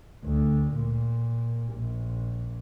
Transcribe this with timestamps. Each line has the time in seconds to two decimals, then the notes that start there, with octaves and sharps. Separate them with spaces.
0.25 D2
0.73 A#2
1.74 A#1